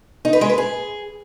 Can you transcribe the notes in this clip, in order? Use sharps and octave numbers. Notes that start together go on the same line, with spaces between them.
D#4
B4
G#3
B4
G#4